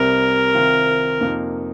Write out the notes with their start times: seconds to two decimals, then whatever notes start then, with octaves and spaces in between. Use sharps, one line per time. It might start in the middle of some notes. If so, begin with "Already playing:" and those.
Already playing: C2 C3 G3 C4 A#4
0.54 C2 C3 D#3 C4 F4
1.21 F2 C3 F3 A#3 D#4